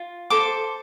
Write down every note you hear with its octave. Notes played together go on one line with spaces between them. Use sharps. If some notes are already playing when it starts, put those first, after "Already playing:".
Already playing: F4
A4 C5 D6